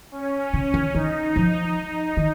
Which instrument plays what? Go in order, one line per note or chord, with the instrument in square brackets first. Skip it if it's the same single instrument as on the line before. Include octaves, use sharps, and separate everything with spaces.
[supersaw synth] C#4
[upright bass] C#3
D#3
[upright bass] D#3 [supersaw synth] D#4
[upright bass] F3
D#3